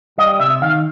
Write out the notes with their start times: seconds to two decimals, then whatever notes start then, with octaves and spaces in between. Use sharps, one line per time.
0.18 G3 D#5
0.40 C3 E5
0.61 D#3 F5